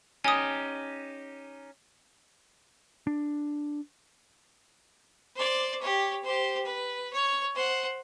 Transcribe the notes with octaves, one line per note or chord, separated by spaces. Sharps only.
C#4 D#4 G4 G#5 D#6
D4
C5 D5
G4 C#5
G4 C5
B4
C#5
C5 F#5